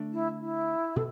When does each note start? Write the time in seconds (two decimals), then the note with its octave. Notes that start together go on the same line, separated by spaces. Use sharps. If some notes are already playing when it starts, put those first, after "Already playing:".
Already playing: D3 A3 D4
0.12 E4
0.40 E4
0.96 B2 A4